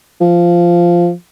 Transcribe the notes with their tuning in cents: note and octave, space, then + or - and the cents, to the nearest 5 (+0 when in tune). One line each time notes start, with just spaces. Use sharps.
F3 -10